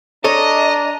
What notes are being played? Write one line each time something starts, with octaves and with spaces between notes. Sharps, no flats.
D4 A4 C#5 D#5 A#5